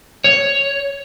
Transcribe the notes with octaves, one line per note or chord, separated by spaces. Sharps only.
C#5